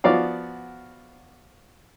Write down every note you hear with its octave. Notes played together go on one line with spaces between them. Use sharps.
F3 B3 F#4 D5 F5